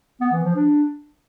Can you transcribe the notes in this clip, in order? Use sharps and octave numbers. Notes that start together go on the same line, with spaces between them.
B3
E3
F3
D4